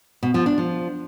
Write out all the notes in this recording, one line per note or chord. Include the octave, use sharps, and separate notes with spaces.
B2
F3
D4
F3